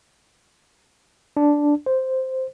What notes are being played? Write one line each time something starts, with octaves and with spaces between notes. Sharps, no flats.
D4
C5